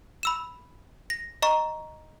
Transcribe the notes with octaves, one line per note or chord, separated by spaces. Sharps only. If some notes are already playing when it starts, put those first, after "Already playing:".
B5 E6 E7
A#6
D#5 A#5 C#6